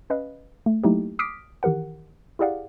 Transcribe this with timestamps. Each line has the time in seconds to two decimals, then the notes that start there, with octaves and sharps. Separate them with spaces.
0.10 C#4 B4 D#5 F5
0.66 A3
0.83 F#3 A3 A#3 D#4 E4 G4
1.19 D6 D#6 F6 B6 C7 D7
1.63 D#3 E3 G4 A#4 F#5
2.39 E4 G4 G#4 D5 F5 F#5